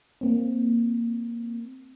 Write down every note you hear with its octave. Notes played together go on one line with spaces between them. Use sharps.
A#3 C4